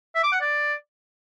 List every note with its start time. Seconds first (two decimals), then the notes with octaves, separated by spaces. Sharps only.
0.15 E5
0.24 D6
0.32 F#5
0.41 D5